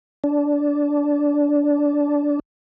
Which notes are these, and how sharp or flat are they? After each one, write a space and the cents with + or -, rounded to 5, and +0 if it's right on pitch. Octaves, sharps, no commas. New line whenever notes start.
D4 -15